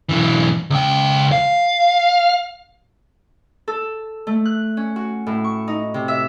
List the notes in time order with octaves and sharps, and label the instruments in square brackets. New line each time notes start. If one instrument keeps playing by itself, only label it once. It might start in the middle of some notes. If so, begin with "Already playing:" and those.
[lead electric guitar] B1 E3
C#2 G5
F5
[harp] A4
A3
F#6
C#4
F#4
A2
C#6
D#4
C3
E5